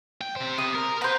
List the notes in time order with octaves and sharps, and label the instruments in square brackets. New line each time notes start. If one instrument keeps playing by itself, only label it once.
[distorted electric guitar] G5
C3 C5
[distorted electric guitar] C3 [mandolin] D#6
[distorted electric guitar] A#4
[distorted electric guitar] B4 [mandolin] C5 A#5